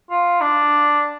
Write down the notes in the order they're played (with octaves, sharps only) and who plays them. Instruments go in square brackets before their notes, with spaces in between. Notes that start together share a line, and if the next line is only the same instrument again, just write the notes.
[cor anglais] F4
D4